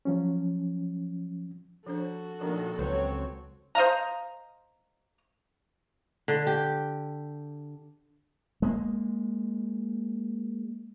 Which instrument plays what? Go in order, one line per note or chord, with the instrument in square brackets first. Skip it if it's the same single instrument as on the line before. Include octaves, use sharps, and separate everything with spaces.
[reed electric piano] F3 F#3 C#4
[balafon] F3 D4 C5 [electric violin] F#4 A4
[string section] A#2 D#3 [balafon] F3 D4
[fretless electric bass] C#2 F#3 [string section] C4 C#5 [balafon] B4
[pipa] C5 D#5 F5 A#5
[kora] D3
G4
[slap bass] G#3 A#3